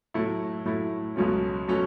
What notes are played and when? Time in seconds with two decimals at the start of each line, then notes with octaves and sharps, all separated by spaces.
0.14 A2 F#3 A3 E4
0.65 A2 F#3 A3 E4
1.16 C#2 B2 F#3 A3 C#4
1.68 B2 F#3 A3 C#4